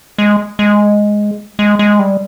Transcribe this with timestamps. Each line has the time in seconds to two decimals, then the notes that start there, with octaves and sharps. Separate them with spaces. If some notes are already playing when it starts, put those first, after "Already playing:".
0.18 G#3
0.59 G#3
1.59 G#3
1.79 G#3
1.99 G3